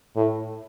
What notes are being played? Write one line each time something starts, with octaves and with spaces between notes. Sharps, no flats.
A2